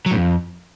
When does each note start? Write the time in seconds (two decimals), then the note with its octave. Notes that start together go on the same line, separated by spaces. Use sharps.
0.06 F#3
0.11 A2
0.16 F2